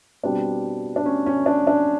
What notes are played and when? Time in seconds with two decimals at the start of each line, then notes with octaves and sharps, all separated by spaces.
0.23 B2 G3 C4 D4
0.96 D4
1.06 C#4
1.26 C#4
1.46 D4
1.67 D4